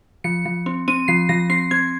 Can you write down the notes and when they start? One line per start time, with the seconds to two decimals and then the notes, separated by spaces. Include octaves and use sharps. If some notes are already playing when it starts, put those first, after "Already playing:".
0.24 F3 C#7
0.45 F3
0.66 C4
0.88 C4 D#7
1.08 F3 C7
1.29 F3 A#6
1.50 C4 C7
1.71 C4 G#6